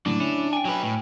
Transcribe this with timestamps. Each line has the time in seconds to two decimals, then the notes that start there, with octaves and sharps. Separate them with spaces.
0.06 F#2 A2 D3 D4
0.20 C#4 E4
0.53 G5 G#5
0.65 F#3 B4
0.83 A2